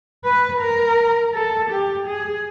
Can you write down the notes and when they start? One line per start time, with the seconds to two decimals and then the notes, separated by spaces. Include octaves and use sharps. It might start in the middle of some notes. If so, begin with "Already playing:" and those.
0.24 B4
0.61 A#4
1.34 A4
1.70 G4
2.07 G#4